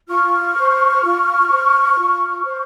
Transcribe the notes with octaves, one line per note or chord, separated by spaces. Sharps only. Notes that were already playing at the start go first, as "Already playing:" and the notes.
F4 C#6 F6
C5
F4
C5
F4
C5